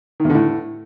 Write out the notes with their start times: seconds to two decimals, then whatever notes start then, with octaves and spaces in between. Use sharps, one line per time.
0.20 D#3
0.25 E2
0.30 D3
0.35 A2